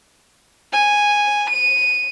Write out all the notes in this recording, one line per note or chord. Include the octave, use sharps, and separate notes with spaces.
G#5
D#7